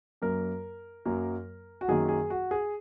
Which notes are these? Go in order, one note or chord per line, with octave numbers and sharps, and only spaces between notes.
F#2 F#3 A#3 A#4
F#2 F#3 A#3
F#4
F#2 D#3 F#3 A#3 G#4
G#4
F#4
G#4